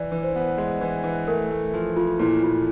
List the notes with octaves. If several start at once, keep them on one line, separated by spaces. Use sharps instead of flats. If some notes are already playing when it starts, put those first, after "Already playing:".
Already playing: E3 D5
E3
C5
B3
G#3
E3
E3
A3 A#4
A3
F3
F3 F4
A#2 E4
A#2 F4